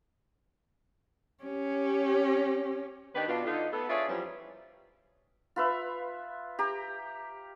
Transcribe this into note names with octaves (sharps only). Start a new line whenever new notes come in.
C#4 G4
D#3 D4 D#4 G4 B4
B2 D4 F4
D3 D#4 F4
B3 A4
D4 F4 G#4 C#5 D5 E5
F#2 E3 F3 G3 C#4
F4 B4 E5
G4 A#5